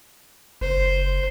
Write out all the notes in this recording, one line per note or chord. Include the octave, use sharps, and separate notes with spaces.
F#1 C5